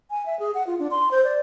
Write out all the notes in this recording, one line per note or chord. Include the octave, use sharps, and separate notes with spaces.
G#5
E5
G#4
F#5
F4
D4
C6
C5
D5